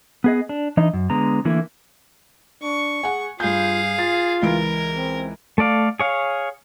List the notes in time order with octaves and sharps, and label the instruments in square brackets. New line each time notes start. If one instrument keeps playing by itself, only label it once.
[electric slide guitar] B3 G#4 D#5
D4
E3 D4 D#4 D#5
F#2
D3 G#3 B3 A#5
D3 E3 A3 A#3 E4
[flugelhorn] D4 [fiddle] C#6
[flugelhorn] G#4 [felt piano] F#5 G#5
[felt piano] G2 G6 [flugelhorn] F4 [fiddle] G#4 F5
[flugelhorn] F4 [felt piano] A6
[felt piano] C#2 E3 D7 [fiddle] A#4
[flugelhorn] C4
[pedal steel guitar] A3 A4 D5 F5
G#4 C#5 F5